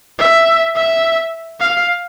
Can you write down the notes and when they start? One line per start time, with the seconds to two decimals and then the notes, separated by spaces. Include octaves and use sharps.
0.19 E5
0.75 E5
1.60 F5